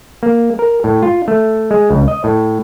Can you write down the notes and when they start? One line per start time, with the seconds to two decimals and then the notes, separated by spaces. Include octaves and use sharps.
0.23 A#3
0.59 A#4
0.84 A2
1.03 F4
1.28 A3
1.71 G#3
1.91 C#2
2.08 D#5
2.24 A2